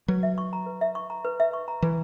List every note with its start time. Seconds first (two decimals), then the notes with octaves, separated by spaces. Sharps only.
0.08 F#3 B4
0.23 E5
0.38 C#6
0.53 A#5
0.66 B4
0.81 E5
0.95 C#6
1.10 A#5
1.25 B4
1.40 E5
1.53 C#6
1.68 A#5
1.82 E3 B4